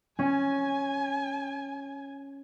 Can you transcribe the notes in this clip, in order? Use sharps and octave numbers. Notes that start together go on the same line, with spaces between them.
C#4 G#5